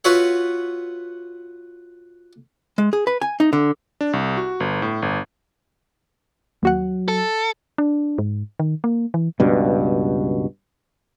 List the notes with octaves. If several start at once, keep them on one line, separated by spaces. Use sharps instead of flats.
F4 F#4 B4 C#5 E5 F#5
G#3
G#4
B4
G#5
D#4
D3
D4
C2
F#4
G1
A2
G1
D#2 F#3 F#4 F#5
A4
D4
G#2
D#3
A#3
E3
C#2 G2 B2